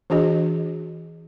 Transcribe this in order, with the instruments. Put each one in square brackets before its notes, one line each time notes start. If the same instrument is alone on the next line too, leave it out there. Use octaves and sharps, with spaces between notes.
[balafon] E3 D4 F#4 G#4 D#5